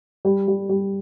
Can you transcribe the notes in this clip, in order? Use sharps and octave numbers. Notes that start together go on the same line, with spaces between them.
G3
G3
G3